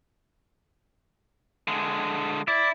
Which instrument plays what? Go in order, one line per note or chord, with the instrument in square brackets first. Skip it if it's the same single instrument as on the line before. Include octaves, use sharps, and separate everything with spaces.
[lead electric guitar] D3 G#3
[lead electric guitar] E4 [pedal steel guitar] D5